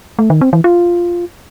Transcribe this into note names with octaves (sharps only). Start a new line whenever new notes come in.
A3
D#3
C4
E3
F4